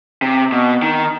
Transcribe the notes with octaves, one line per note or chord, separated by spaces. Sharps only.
C3
B2
D#3